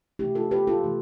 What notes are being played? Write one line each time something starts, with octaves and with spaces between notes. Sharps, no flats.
C3 E3 A3 E4 G4
F4 A4
G4 B4
F4 A4
C3 E3 A3